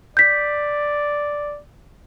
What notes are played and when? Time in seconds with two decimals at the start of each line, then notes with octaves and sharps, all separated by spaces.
0.17 D5 G6 B6